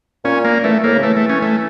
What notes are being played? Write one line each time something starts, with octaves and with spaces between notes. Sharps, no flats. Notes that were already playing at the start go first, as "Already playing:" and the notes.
A#2 C#4
A#3
E3 A3
A2 A#3
C#3
E3 A3
A3
C#4
A3